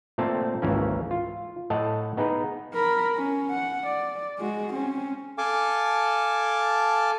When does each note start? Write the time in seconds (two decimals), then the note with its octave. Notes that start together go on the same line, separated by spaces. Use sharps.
0.18 A#2 A3 C4 A5
0.62 G#1 C#2 C#3 E3 A#3 C#4
1.11 F4
1.70 A2 A4 D#5 F#5 A5
2.17 B3 D#4 G#4 B4
2.74 A#4 B5
3.15 C#4
3.51 F#5
3.87 D5
4.39 G#3 F#4
4.74 C4 C#4
5.38 A4 F5 G#5 A5 D6